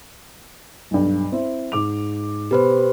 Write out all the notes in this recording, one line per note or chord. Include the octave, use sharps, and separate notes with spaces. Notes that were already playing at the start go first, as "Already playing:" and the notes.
B1 G2
C4 E4
G#2 D6 F7
B2 G4 B4 C5 B5